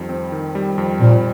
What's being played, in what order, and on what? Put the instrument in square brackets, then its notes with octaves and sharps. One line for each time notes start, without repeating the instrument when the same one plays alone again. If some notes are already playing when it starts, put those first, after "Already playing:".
Already playing: [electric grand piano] F2 D#3 G3
C4
D#3
G3
F2
[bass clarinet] A#2 [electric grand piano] C4